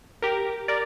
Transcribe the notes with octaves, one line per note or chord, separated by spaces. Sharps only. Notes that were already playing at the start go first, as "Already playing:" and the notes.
G4 A#4
A#4 D5